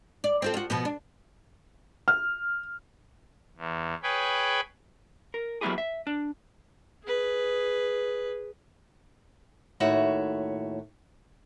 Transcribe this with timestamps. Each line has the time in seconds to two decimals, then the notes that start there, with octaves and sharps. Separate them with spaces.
0.24 D5
0.42 C4 F4 A4
0.54 F4 F#4
0.70 B2 F3 B3
0.85 D4
2.08 F6
3.57 E2
4.03 G#4 B4 C#5 G5 B5
5.34 A#4
5.61 F#3 A#3 B3 E4 G4 G#4
5.78 E5
6.07 D4
7.04 G#4 B4
9.80 D#2 A2 F#4 C#5 E5